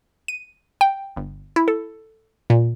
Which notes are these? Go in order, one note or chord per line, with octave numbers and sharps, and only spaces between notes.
D#7
G5
G1
E4
A4
A#2